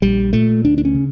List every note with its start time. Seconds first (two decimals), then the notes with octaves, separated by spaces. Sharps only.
0.02 A#1 G3
0.33 A#2 A3
0.65 D2 D4
0.78 D4
0.85 C#4
0.95 C#3